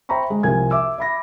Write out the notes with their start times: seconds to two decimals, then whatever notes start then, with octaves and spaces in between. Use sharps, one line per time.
0.09 C5 E5 G5 A#5 B5 C#6
0.30 G#3
0.43 C2 F3 A#4 G#5 G#6
0.71 E5 D6 E6
0.98 E5 B5 A#6